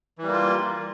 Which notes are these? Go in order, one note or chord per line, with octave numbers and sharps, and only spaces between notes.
E3 G3 A#3 F4